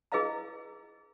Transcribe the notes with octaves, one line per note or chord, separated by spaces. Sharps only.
E4 G#4 B4 D#5 F5 A#5